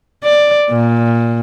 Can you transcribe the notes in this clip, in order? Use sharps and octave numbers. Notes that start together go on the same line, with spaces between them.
D5
A#2